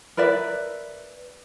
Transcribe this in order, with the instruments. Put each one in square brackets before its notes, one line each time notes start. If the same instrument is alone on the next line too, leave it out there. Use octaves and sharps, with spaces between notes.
[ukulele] A#4 B4 D5 E5